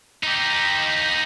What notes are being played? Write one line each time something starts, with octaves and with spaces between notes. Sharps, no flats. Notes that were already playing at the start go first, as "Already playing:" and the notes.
D#4 G4